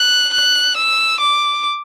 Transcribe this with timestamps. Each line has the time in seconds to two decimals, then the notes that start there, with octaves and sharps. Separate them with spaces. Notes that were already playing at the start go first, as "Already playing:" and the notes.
Already playing: F#6
0.34 F#6
0.77 E6
1.21 D6